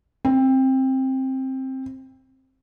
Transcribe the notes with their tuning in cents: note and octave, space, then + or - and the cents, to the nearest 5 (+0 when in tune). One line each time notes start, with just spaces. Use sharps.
C4 +15